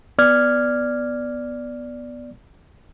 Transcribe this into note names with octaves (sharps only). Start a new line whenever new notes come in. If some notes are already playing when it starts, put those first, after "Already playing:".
B3 D5 F6 G#6